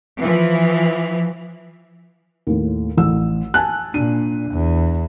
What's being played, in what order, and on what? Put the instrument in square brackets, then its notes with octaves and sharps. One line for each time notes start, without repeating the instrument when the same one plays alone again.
[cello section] E3 F3
[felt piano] D#2 A2
A1 E6
G#5 A5 F#6
[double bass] A#2 [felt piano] D4 D#7
[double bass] E2